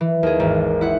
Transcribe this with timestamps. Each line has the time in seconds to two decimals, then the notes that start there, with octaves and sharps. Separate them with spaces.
0.01 E3
0.23 D#2 G#4
0.40 G#1
0.81 E4 F#5